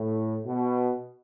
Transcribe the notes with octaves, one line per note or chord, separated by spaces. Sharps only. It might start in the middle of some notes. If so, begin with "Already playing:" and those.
Already playing: A2
B2